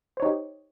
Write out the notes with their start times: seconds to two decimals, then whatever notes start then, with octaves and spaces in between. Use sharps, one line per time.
0.17 C5
0.20 C#5
0.22 D#4
0.25 G4